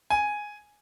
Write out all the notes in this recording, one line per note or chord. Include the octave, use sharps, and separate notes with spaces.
G#5